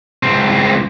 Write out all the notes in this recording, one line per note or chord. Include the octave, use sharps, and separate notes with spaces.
C#2 C4